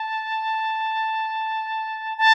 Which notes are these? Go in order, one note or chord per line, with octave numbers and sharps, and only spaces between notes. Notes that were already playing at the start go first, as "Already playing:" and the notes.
Already playing: A5
A5